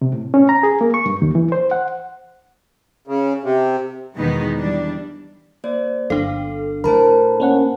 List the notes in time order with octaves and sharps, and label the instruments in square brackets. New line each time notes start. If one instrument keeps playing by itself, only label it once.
[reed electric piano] C3
A2
C#4
A#5
G#4
A#3
C#6
G2
D#2
E3
C5
F#5
[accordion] C#3
C3
[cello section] E2 B2 D#3 G#3 B3 D#4
E3 G3 D4
[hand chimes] A#3 C5 D5
[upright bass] G1 [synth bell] D4 A4 [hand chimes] F5 C6
[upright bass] A2 [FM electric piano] A#4 [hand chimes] C5 A5 B5
[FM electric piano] A#3 C#4 F#5